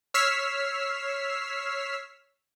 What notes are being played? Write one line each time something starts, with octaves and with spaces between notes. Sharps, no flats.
C#5 E6 F6 B6 C7